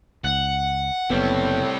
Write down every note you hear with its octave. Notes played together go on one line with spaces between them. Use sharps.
C#2 F#5
F#1 A2 G3 B3 C4